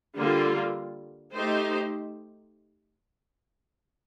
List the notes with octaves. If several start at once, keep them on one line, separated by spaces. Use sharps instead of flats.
D3 G3 A#3 F4
A3 D#4 G4 C5